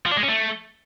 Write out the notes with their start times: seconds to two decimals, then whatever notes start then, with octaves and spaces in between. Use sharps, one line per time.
0.06 F3
0.11 D4
0.17 G#3
0.23 C#4
0.29 A3